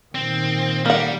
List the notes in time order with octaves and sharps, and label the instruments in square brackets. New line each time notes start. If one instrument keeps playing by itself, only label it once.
[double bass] A#2 D#3 [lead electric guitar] C4
[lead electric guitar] G3 [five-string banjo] A#3 F#5